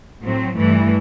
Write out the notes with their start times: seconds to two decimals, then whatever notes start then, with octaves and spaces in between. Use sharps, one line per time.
0.22 A2 F#3 C4
0.55 G2 E3 A3